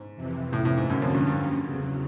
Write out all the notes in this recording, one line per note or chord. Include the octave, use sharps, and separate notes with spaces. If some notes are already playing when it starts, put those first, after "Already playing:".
Already playing: G#2
F2 C3 E3
A2
A2
G#2
F#2 D3 F#3 A#3 C#4
F2
G2
G2
E2 C#3 F#3